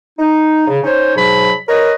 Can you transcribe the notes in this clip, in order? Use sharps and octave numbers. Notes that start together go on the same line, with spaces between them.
D#4
C#3
C#4 D#4 C5 C#5
G#2 B2 F#3 B5
A#4 B4 C#5 D#5